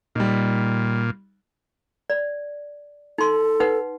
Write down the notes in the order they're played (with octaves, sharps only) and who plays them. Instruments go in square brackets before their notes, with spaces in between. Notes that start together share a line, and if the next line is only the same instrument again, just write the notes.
[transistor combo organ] A#2 [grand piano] G3 D#4
[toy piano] D5
[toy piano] D#4 C6 [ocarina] A4
[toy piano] D#4 B4 F#5